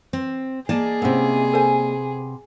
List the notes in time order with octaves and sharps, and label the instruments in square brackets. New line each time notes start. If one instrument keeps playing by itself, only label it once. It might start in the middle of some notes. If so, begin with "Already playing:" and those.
[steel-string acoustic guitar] C4
[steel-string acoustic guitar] A#3 D5 D#5 [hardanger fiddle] G#4 [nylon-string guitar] A5
[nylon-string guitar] C3 B3 [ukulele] C#4 E4
[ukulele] A4 C5 G#5